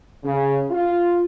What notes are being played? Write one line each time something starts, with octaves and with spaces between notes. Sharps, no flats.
C#3
F4